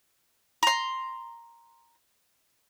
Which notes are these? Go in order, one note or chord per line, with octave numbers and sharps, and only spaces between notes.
A#5 C6